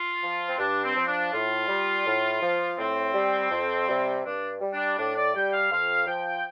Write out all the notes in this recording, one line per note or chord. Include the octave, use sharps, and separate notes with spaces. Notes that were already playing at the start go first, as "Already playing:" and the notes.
Already playing: F4
F3
C4
G2 D4
C4
F3
D4
A2 F4
G3
A2
F3
A2 C4
G3
F2
C3 G3
G2 D4
G3
D4
A2 D4
D5
G3 G5
F5
F2 F5
F3 G5